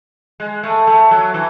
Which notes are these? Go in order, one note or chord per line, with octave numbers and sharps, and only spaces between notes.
G#3
A3
A3
F#3
E3